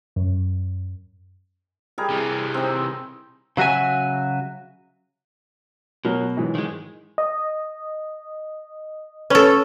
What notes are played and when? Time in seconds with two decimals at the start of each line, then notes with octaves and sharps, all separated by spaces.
0.16 F#2
1.98 G3 G#4 A#4
2.10 C3 E3
2.54 C4 D#4
3.57 C#3 F#3 F#4 E5 G#5
6.05 B2 F#3 A#4
6.37 G#2 E3 F#3
6.55 D#3 G#3
7.18 D#5
9.30 C#4 A4 B4 C#5